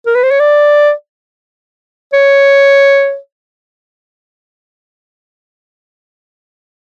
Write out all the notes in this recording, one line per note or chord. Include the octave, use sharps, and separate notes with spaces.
A#4
B4
C5
C#5
D5
C#5